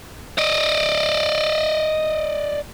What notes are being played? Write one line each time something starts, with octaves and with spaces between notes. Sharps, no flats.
D5 D#5